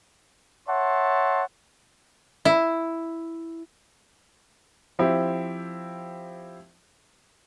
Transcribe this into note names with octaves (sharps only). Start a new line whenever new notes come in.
C#5 E5 F#5 A5 C6
E4
F3 C4 E4 G4